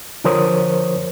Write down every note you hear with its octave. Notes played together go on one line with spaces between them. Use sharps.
D3 F3 A#4 C5 C#5 D#6